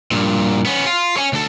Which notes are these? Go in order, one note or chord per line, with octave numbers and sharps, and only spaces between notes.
G2 A#2
B3 C#4
F4
C#5 G#5
D2 A4